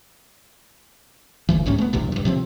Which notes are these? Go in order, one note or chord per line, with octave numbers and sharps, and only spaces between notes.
E1 D2 E3
B1 G#2 C3 C#4
A3 B3
A#1 E2 G2 C3
G2 F3
C3 F3 G#3 C4